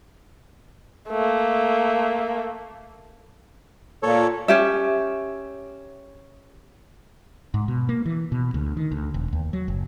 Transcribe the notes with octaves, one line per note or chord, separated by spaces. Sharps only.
A3 A#3
A#2 A4 C#5
C#4 G4 E5
G#2
B2
A#3
E3
B2
D2
D#3
D2
E1
D#2
F#3
F#1